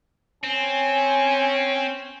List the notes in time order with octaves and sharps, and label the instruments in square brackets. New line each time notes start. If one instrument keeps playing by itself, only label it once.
[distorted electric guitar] C4 [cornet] C#4 [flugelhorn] G#5